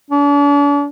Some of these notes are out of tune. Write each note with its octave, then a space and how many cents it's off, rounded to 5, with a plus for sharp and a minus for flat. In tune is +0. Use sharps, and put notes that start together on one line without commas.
D4 -45